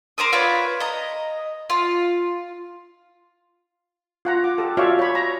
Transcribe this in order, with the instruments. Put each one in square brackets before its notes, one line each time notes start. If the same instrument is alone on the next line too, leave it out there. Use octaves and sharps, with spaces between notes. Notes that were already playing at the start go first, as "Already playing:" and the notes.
[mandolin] A#4 C5 D6 D#6
F4 B4 C#5 D5
D#5 A#5
F4
[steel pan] F4 F#5 A#5
D6
G4 A4
F4 F#4 C#5 D5 E5 F5
C#5 B5
A#5